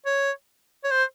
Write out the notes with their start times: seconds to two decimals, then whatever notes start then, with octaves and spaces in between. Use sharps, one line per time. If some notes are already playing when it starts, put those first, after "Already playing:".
0.06 C#5
0.84 C#5
0.91 C5